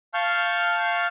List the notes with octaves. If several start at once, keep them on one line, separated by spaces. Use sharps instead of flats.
F5 A5 C#6 F6 G6